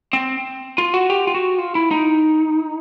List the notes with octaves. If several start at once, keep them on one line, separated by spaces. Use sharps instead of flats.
C4
F4
F#4
G4
F4
F#4
F4
E4
D#4